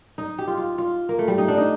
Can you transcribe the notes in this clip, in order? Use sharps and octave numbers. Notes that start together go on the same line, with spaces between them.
D#4
G4
F4
F4
F4
A#3
A3
G3
D#4
D4
D#4